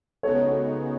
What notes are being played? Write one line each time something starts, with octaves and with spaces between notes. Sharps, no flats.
C#3 G#3 B3 D#4 F#4 A4 C#5